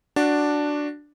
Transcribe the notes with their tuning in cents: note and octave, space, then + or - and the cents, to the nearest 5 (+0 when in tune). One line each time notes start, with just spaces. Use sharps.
D4 +0 F#4 +0 D5 +0